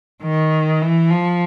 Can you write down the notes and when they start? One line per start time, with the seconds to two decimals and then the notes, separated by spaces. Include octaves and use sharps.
0.23 D#3
0.82 E3
1.11 F3